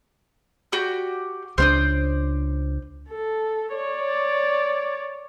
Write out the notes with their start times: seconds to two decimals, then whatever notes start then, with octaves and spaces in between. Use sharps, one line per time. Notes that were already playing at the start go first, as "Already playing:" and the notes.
0.72 F#4 G4 D5
1.58 C#2 A3 D4 C5 D5 D#6
3.09 A4
3.75 C#5 D5